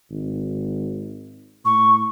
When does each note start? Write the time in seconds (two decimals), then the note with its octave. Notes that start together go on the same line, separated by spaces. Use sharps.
0.10 G#1
1.65 A2 C#6